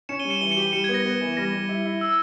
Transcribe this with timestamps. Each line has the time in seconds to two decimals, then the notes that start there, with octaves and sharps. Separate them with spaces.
0.09 C#4 C#7 E7
0.19 D#7 G7
0.25 G3
0.30 C#7 E7
0.41 E3 D#7 G7
0.51 C#7 E7
0.57 G4
0.62 D#7 G7
0.73 G3 C#7 E7
0.84 G#6
0.89 B3
0.94 A#6
1.05 B3
1.21 E3
1.37 G3 A#6
1.53 G3
1.69 E4
1.85 E4
2.01 E6